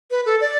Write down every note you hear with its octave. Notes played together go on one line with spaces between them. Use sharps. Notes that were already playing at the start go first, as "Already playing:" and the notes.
B4
A4
D5